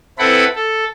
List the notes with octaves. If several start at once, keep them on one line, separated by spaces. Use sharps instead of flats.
C4 E4 A4 B4 F#5 B5
A4